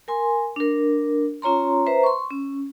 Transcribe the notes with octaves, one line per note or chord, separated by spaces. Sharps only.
A#4 G#5 C6
D4 A#4
C#4 F4 C#5 A#5 C6
B4 C5 E5 A#5
C6 C#6
C#4